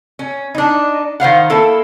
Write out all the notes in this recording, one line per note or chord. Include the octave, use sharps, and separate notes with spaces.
C#4
D4 D#4
D#3 C5 F5 F#5
A#3 E4 A4